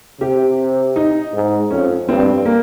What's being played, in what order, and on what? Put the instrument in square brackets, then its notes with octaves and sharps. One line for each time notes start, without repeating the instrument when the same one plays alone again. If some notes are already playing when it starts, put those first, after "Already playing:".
[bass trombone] C3 [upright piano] G4
[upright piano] D#4
[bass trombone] G#2
[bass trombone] F2 [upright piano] C#4
[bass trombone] G2 [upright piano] C4
[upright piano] A#3